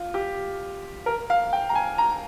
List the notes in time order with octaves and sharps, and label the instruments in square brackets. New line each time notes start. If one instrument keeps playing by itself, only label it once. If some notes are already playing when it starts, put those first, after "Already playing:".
Already playing: [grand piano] F4
G4
A#4
F5
G5
A#5
G#5
A#5